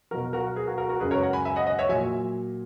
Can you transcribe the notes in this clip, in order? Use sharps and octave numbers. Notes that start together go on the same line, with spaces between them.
B2 F#3 F#4 A#4
F#4 A#4
G#4 B4
F#4 A#4
F#4 A#4
F#4 A#4
F#2 C#3 G#3 G#4 B4
A#4 C#5
F#5 A#5
G#5 B5
E5 G#5
D#5 F#5
D#5 F#5
C#5 E5
A#2 F#3 E5 G#5